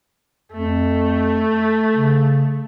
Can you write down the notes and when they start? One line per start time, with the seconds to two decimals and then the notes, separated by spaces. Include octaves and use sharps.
0.52 F2 A3
1.96 C#3